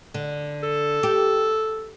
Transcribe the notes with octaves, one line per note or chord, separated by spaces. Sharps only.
D3
A4
G4